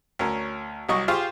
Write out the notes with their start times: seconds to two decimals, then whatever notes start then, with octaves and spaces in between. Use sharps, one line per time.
0.19 D2 C#4 A#4 C#5
0.89 C2 F#3 D#5 C#6
1.08 F4 G4 G#4 C5 F5 C#6